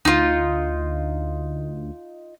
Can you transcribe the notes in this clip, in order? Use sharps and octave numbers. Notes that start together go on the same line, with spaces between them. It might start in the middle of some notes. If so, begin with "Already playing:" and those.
D2 D#4 F4